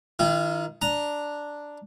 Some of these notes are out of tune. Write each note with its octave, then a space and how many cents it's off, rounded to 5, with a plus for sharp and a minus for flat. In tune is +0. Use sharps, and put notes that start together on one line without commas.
D#3 +10 F4 -45
D4 +0 A#5 +0